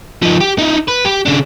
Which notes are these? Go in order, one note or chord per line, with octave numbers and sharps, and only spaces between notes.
F3 D#4
G4
D#4 E4
B4
G4
C#3 D4